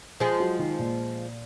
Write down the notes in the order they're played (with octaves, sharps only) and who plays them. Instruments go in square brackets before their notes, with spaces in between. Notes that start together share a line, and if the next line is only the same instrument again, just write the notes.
[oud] F3 G#3
[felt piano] F#3
D#3
A#2